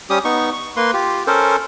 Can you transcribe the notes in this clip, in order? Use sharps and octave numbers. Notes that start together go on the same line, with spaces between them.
G3 C#4 G4 D#6
B3 D#4 C#6
C#6
A#3 B4 C6
F4 G4
C#4 A4 A#4 C5